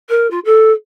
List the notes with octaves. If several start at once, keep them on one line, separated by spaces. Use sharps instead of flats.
A#4
F4
A4